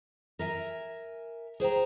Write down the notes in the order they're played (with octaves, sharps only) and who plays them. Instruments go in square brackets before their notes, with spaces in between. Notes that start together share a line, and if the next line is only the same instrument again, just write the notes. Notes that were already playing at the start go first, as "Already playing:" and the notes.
[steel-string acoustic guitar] A#4 E5 G#5
G#4 C5 G5 A#5